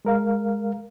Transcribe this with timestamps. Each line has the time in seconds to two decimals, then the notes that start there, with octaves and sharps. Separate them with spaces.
0.05 G#3 A#4 F5